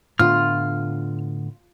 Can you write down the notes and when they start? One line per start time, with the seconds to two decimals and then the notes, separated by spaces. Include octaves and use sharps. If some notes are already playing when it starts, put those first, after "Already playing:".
0.19 A2 D3 B3 F4 F6